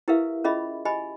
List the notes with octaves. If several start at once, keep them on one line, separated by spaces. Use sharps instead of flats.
E4 G4 A#4 B4 E5 F5
C#4 F4 G#4 D#5 E5 B5
G4 D#5 G#5 B5